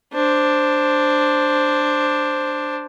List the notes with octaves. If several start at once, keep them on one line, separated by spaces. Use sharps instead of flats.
D4 C5